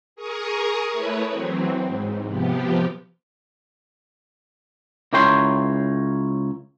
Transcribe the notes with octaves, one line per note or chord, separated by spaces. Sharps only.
G#4 A#4 C#6 D#6
A3 E4 B4 C#5
E3 F#3 C4
G#2
C3 F3 B3 G4
C#2 E4 A#4 C#5 G5 C6